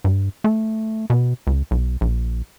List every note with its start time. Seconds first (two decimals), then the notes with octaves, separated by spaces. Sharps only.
0.04 G2
0.44 A3
1.10 B2
1.47 C#2
1.71 B1
2.01 A#1